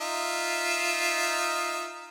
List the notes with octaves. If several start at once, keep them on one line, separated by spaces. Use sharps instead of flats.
D#4 F4 E5